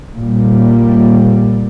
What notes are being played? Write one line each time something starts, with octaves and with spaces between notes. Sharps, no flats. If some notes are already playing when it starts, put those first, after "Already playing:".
A#2 G3